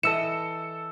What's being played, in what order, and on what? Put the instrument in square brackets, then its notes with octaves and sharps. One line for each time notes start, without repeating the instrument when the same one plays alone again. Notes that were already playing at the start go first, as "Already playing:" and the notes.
[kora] E3 D#5 [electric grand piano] A4 E6 C#7 [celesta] E7